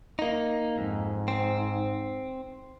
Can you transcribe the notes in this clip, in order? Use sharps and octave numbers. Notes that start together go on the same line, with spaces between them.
A#3 D#4
F2 G#2
C4